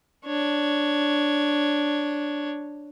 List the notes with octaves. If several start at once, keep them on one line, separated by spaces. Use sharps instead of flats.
D4 C#5